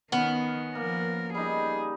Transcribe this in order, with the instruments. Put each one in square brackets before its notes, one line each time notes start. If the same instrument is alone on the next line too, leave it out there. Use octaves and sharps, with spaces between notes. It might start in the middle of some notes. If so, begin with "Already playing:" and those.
[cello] D#3 [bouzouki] B3 [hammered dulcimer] C#4
[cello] F3 A#4 [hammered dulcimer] A#3
[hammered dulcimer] G3 D#4 [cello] G#4